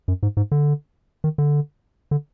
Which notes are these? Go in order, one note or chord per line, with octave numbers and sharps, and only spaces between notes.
F#2
G#2
G#2
D3
D#3
D3
D3